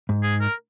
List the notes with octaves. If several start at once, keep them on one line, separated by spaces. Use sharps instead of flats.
G#2
G#4
A#4